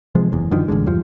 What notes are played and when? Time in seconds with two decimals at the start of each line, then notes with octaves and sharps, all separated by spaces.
0.15 C3 F3 G#3
0.32 F#1 E2
0.51 F#2 D3 D#3 F3
0.68 A1 G#2 D3 G#3
0.86 E2 G2 F3